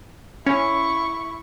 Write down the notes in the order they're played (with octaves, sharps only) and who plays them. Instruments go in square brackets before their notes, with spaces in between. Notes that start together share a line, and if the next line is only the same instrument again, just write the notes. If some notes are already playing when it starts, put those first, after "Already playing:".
[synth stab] C#4 [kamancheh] E4 C#6